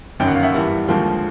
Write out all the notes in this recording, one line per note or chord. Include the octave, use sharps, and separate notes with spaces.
G1 F#2 D#3 F#3 G5
F#5
F5
E5 F#5
G2 E3 G3
D#2 D3 F3 G#3 F5 G5